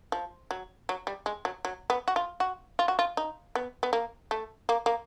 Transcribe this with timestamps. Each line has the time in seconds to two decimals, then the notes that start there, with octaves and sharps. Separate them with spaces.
0.12 F3
0.51 F#3
0.89 F#3
1.07 G3
1.26 G#3
1.45 F#3
1.65 F#3
1.90 B3
2.08 F#4
2.16 F4
2.40 F#4
2.79 F4
2.88 F#4
2.99 F4
3.17 D#4
3.55 B3
3.83 B3
3.93 A#3
4.31 A3
4.69 A#3
4.86 A#3